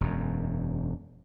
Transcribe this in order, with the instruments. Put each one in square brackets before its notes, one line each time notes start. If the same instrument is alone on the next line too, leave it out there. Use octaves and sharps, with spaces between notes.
[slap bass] E1 F#2